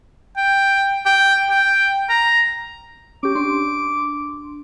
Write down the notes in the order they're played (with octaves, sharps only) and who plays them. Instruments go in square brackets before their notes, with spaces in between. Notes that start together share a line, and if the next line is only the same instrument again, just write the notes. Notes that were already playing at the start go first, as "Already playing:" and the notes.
[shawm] G5
G5
G5
A#5
[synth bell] C#4 G4 [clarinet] D6
[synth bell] D4 C6